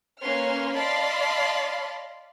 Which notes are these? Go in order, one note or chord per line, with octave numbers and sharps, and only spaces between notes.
A#3 C#4 B4 C6 F6
D5 D#5 F5 A5 B5 C6